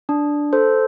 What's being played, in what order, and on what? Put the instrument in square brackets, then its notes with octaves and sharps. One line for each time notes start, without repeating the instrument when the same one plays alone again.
[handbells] D4
A4 C5